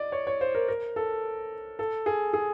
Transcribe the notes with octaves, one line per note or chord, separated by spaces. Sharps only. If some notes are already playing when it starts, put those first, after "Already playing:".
Already playing: D5 D#5
C#5
C#5
C5
A#4
A#4
A4
A4
G#4
G#4